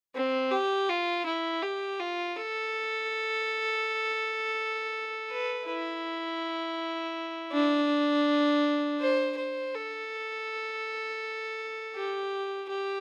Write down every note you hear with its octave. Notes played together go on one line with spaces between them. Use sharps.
C4
G4
F4
E4
G4
F4
A4
B4
E4
D4
C5
C5
A4
G4
G4